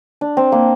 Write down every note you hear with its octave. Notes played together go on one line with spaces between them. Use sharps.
D4
C4
A#3